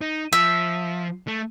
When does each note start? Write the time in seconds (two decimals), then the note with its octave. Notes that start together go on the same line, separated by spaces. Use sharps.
0.01 D#4
0.33 F3 E5
1.28 A3